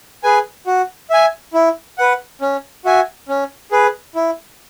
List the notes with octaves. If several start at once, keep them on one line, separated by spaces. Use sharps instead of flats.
G#4 B4 G#5
F#4
E5 G#5
E4
B4 F#5
C#4
F#4 E5 G#5
C#4
G#4 B4
E4